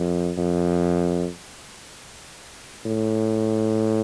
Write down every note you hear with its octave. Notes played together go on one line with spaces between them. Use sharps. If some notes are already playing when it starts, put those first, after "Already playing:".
Already playing: F2
F2
A2